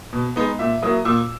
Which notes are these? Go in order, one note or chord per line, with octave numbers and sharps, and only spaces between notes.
B2
G#3 B3 D#4
A#2 E5
F#3 A#3 E4 D#6
A#2 E6